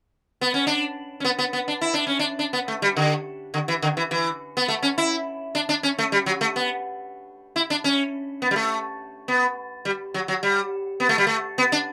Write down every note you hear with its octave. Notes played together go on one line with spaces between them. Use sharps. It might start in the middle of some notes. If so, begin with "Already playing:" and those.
B3
C#4
D4
C#4
B3
B3
B3
D4
E4
D4
C#4
D4
D4
B3
A3
G3
D3
D3
E3
D3
E3
E3
B3
A3
C#4
E4
D4
D4
C#4
A3
G3
F#3
A3
B3
E4
D4
C#4
B3
G3
A3
B3
G3
F#3
F#3
G3
B3
A3
G3
A3
B3
D4